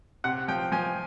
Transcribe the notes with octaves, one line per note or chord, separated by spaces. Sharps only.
C3 F#5
F3 G5
F3 G#5